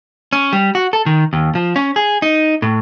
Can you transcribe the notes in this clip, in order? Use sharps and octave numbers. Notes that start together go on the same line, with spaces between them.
C#4
G3
F#4
A4
D#3
D#2
F3
C#4
G#4
D#4
A2